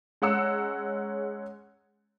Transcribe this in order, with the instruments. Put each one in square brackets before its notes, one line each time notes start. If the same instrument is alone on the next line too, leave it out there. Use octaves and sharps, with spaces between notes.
[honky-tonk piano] G#3 C#4 F#5 A#5 E6 C#7